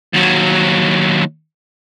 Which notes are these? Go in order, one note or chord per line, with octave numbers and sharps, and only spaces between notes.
D#2 F#3